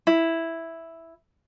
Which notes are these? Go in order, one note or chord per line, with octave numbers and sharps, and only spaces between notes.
E4